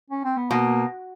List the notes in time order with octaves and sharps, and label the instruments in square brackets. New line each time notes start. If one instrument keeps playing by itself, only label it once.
[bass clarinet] C#4
C4
B3
[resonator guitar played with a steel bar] B2 [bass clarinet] A#3